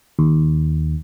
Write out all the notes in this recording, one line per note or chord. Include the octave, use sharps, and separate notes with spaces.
D#2